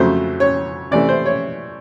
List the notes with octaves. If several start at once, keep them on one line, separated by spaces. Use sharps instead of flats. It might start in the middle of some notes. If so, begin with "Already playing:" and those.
Already playing: F2 C#3 F#3 A3 C5
C#5
C3 E3 A3 D5
C5
C#5